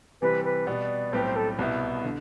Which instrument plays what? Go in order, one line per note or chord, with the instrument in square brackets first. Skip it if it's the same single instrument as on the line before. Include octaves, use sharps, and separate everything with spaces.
[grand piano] C3 E3 G3 C4 [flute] B4
[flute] B4
[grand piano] B2 G3 B3 [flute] D5
[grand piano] B1 A2 G3 C4 G4 [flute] B4
[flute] C5
A4
[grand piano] C2 B2 B3 E4
D3